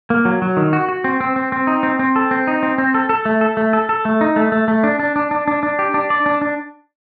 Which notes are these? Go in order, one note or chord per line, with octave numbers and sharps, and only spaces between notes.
A#3
F#3
F#3
D#3
F#4
F#4
C4
C4
C4
C4
D#4
C4
C4
A4
C4
D#4
C4
C4
A4
A4
A3
A4
A3
A4
A4
A3
D#4
A3
A3
A3
D4
D4
D4
D4
D4
D4
G4
D4
D5
D4
D4